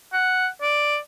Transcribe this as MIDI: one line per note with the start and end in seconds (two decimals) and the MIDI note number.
0.13 0.48 78
0.62 0.97 74